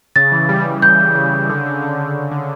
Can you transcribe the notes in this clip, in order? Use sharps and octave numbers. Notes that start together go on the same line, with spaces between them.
C#3 A6
E3
G3
G3
C#3 G6
G3
C#3
C#3
D3
D3
D3
D3
D3
D3